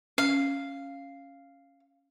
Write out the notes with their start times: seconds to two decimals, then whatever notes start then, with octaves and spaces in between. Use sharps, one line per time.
0.18 C#4 F5